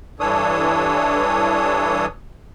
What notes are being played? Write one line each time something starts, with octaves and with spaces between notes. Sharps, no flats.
G2 E3 D4 A4 C#5 D#6